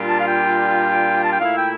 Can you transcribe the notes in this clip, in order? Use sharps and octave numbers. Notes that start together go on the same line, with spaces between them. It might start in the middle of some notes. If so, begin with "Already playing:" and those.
Already playing: A#2 G3 D4 F4
A5
F5
G5
A5
G5
A#2 A3 E4 F5
G5